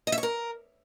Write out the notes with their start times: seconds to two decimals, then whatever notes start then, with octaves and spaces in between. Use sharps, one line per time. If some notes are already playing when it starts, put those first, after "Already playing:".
0.07 D#5
0.12 E5
0.18 C#5
0.23 A#4